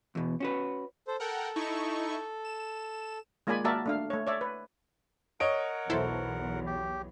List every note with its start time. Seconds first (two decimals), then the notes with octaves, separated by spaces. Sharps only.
0.15 E2 B2
0.40 C#4 F#4 B4
1.07 A4 C5
1.20 A4 A#4 F#5 G5
1.56 D#4 E4 C#6
2.45 E7
3.47 G#3 A#3 F4 D5 G#5 B5
3.65 A#3 F#4 A#4 D5 E5 A5
3.86 A3 D4 F5
4.10 A3 C#5
4.27 C#5 D5 E5
4.41 B4
5.40 A#4 C#5 D#5 F#5 D7
5.90 B1 E2 E4 A4 C5
6.66 G4